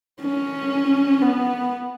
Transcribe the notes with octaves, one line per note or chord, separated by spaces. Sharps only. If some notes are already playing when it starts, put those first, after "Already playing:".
C#4
B3